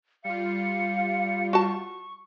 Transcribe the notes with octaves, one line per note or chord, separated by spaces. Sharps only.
G3 F4 F5 C#7
F#4 A5 C#6